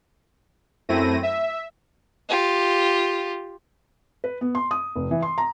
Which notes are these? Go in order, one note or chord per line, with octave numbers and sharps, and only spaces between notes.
F#2 A3 C4 E4 A#6 D#7
E5
F4 G4
B4
B3
C6
D#6
F1
E3
C6
A#5